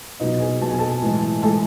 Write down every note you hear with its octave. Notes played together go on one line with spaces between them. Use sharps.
B2 F#3 D#4 D#5
G#4 G#5
B2 F#3 A5
G#5
A4 A5
A2 E3 G#3
A2 E3 G#3 A4 A5